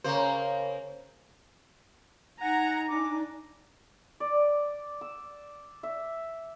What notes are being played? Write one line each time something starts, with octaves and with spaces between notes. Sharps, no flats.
C#3 A#3 C5
D#4 F#5 G#5 A#5
D4 G#5 A#5 D6
D5
E6
E5